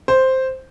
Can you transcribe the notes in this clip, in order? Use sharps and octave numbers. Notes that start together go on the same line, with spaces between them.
C5